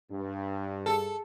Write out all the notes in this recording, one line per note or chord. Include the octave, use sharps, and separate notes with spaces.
G2
G#4 A4 A5